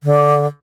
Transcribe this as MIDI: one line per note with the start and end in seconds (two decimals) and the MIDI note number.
0.03 0.46 50